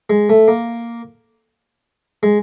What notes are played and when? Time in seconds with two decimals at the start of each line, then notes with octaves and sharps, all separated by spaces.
0.10 G#3
0.29 A3
0.48 A#3
2.23 G#3